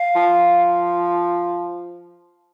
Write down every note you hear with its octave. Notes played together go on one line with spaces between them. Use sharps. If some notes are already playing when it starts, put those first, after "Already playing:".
Already playing: F5
F3